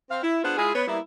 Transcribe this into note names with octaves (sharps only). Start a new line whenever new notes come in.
C4 F5
E4
B3 D4 F4 G#4 C5 F#5
G#3 E4 F4 G#4
B3 B4 C#5
G3 A#3 B3 E4